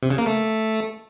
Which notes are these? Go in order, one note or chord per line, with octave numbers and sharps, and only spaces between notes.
C3
C#3
A#3
A3